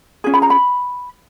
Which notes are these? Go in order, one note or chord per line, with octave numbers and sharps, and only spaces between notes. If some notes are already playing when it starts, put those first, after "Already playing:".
C#4 F4 G#4
B5
A#5
B5